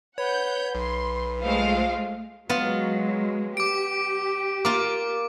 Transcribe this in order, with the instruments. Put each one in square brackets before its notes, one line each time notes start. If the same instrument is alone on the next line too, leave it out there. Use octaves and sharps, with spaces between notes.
[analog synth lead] B4 [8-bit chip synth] C#5 [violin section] F#5 G6
[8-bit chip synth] B1 [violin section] C6
[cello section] G#3 A3 F4 [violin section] C5 F5
[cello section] F#3 G#3 [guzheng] B3 F4
[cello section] G4 [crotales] D6 D7
[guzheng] A#3 F4 [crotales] D6